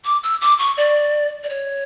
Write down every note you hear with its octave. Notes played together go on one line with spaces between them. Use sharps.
D6
E6
D6
C#6
D5
D5
C#5